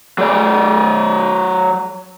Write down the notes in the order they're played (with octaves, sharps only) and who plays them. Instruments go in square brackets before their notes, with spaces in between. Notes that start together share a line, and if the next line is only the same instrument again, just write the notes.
[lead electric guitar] F#3 D5